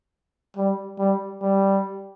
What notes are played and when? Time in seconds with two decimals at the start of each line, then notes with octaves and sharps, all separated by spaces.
0.57 G3
0.99 G3
1.42 G3